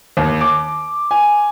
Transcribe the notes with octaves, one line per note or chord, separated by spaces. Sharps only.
D#2
D6
G#5